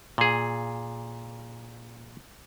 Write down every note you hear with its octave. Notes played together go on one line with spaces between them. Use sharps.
A#2 G#4